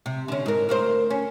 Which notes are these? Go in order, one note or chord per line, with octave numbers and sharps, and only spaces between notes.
C3
D3 C#4
G#2 A#4
D2 A#4 C5
C#4